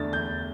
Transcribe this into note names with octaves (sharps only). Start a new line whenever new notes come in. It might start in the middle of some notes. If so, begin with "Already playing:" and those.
Already playing: E2 D3 A3 D4 A6
E2 G6